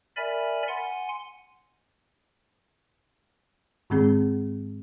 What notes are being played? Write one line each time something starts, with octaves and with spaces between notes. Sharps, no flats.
A#4 D5 E5 G#5 B5
F#5 G#5 C6
G#2 D#3 G#3 C4 G#4